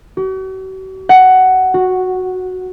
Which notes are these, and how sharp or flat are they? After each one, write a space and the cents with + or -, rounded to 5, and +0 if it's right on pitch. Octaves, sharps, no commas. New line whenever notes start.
F#4 +45
F#5 +10
F#4 -5